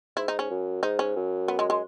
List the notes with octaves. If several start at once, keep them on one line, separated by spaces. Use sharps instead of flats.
G#2 E4
D#4
C#4
F#2
G#2 D#4
C#4
F#2
B3
G#3
G#3